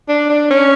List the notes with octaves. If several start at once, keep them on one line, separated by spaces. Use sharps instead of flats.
D4
D4
C#4